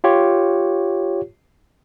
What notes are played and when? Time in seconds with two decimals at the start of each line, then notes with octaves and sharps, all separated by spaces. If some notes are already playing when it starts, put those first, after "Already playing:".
0.04 F4 G4 C#5